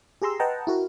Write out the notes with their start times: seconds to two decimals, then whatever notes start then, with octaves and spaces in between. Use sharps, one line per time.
0.22 G4 G#4 A#5 C6 E6
0.40 B4 D#5 F#5 G5 A5 A#5
0.67 E4 F#4 A#4